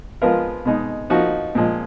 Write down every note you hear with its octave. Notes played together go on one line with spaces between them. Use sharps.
F3 G#3 B3 F4 A#4
B2 G#3 D#4
F3 A#3 D#4 F#4
A#2 F3 G#3